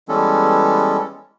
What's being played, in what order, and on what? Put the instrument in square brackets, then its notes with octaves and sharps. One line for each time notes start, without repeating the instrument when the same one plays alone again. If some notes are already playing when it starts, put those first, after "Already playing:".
[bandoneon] E3 G3 G#3 B3 C#4 A4